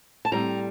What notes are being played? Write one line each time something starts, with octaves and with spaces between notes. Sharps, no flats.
A5
A2 G3 C4 A#5